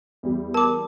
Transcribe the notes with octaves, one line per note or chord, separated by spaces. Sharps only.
E2 G3
A#4 A5 D6